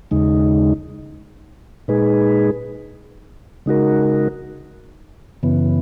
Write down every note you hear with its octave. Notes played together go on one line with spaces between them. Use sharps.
D#2 C#3 G#3 D#4
A#2 G#3 D#4 G#4 B4
C#3 G#3 D#4 F#4 A#4
F#2 C#3 E3 B3